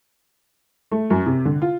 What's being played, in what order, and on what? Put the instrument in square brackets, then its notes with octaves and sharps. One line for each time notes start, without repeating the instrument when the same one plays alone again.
[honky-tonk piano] A3
F#2
C3
D3
F4